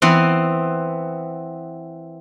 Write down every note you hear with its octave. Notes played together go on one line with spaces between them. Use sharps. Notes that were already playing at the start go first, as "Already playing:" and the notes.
E3 B3 C4